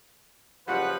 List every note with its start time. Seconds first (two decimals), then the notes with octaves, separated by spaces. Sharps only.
0.68 F#1 F3 G3 F4 F#4 B4 F#5